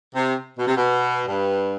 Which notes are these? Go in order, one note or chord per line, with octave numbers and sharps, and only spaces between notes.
C3
B2
C3
B2
G2